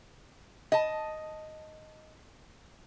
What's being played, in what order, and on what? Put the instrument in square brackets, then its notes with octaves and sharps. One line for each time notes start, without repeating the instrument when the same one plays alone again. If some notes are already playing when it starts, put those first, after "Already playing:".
[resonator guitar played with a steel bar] D#5 A5